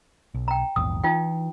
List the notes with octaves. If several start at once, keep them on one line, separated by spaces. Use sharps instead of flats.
B1
G5 A#5
A#1 E2 G#2 D#6
E3 D#4 F4 G5